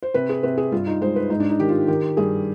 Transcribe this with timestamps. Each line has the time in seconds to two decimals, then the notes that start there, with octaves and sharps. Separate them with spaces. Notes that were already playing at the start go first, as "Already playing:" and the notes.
0.03 C5
0.14 C3 B4
0.29 G#4
0.43 C3 B4
0.57 G#4
0.72 G2 F4
0.87 D#4
1.01 G#3 C5
1.16 B4
1.30 G#2 D#4
1.40 D4
1.49 D#4
1.60 D#3 G4
1.69 F4
1.88 D#3 G4
2.17 G2 G#4